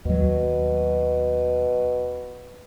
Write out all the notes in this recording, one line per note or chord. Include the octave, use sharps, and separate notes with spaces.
D#2 B2 F#3